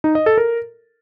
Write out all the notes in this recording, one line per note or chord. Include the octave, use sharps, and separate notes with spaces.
D#4
D#5
A4
A#4